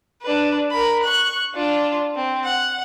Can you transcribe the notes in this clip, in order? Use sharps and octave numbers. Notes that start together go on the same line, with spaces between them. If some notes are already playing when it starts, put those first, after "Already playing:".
D4 B4
A#4 B5
C#6 F#6
D4 F4
C4
F#5